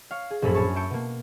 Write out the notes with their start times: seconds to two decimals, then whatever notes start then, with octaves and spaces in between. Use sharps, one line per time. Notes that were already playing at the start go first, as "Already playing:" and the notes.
0.11 C#5 F5
0.31 G#4
0.42 A#1 F#2 A2 C#4 A4 B5
0.55 C#5 G#5 A5 C#6
0.75 E5 A5 C#6 G6 C#7 D7
0.90 B2 A#3